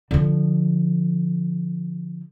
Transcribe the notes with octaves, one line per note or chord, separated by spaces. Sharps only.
D3 F3